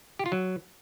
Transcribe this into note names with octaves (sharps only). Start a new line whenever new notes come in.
G4
F4
F#3